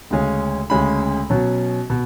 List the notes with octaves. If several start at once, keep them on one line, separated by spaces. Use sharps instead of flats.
D2 C#3 G#3 C#4
D2 C#3 G#3 C#4 B5
B2 F#3 C#4
B2